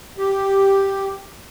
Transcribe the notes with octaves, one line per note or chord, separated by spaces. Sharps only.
G4